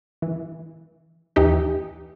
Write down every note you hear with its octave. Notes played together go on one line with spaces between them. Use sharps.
E3
D#2 E3 D#4 G4